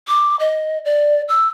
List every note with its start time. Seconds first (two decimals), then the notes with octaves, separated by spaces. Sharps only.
0.08 D6
0.40 D#5
0.85 D5
1.29 E6